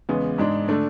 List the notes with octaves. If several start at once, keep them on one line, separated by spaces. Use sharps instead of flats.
E2 C#3 G#3 B3
G#2 G#3 D4
D3 A3 D4